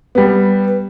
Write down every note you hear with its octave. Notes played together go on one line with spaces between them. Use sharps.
G3 B3